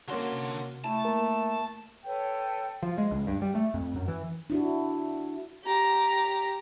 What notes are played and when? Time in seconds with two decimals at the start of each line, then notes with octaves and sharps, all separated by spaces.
0.08 D3 A#3 C#4 F#4 C6
0.33 C3
0.84 A3 E4 A5
1.05 A#3 A#4
2.04 A4 B4 C#5 G5
2.83 F3
2.98 G#3
3.11 C#2
3.27 G2
3.42 G3
3.55 A3
3.74 F2
3.96 F#2
4.08 E3
4.50 D4 E4 F#4
5.64 G4 A#5